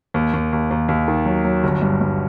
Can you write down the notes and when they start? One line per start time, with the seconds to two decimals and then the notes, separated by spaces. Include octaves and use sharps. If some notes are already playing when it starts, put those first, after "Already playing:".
0.14 D#2
0.33 D#2
0.53 D#2
0.71 D#2
0.89 D#2
1.08 D#3
1.26 F#3
1.45 F#3
1.64 G1
1.82 G2
2.01 G2